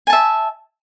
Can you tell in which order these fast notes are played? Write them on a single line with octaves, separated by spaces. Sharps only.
G#5 A5 E5